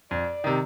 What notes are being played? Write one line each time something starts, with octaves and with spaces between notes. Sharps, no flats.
F2 D5
C3 D#3